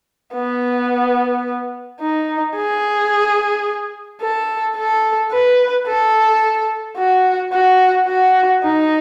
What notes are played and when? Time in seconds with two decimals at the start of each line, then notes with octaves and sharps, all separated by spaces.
0.35 B3
2.00 D#4
2.56 G#4
4.22 A4
4.76 A4
5.32 B4
5.87 A4
6.98 F#4
7.53 F#4
8.08 F#4
8.64 D#4